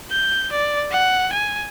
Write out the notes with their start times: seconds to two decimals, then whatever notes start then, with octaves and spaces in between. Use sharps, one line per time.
0.11 G6
0.52 D5
0.92 F#5
1.33 G#5